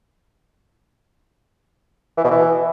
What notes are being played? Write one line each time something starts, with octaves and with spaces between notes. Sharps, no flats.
E3
B2
E3